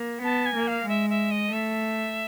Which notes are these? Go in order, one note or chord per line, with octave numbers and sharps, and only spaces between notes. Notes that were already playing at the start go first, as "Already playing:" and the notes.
Already playing: A#3
B3 A5
G#5
A#3
F5
G#3 E5
E5
D#5
A3 E5